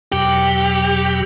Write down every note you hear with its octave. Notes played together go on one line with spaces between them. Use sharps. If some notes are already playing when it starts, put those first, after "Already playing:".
E2 B2 F#3 G4